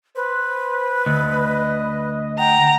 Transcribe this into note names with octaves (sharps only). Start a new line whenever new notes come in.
B4 C5
D2 D#5
F#5 G5 A#5